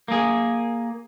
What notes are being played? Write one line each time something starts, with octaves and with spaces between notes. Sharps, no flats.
A#3 G#4